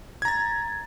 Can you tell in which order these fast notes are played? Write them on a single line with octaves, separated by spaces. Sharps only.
G#6 A#5 A6